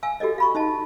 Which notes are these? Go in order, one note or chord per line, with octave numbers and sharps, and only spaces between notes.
F5 G#5 E6
F#4 G4 A4 D5 D#5
F5 B5 C#6
D#4 D#5 A5